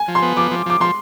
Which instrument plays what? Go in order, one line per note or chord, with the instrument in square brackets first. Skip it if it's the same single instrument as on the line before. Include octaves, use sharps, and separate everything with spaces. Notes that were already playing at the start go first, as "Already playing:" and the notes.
Already playing: [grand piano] G#5
[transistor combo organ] F3
[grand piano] C6
[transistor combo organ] B3
[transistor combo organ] F3 [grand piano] D6
[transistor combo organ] F3
[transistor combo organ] F3 [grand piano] D6
[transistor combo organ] F3 [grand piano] C6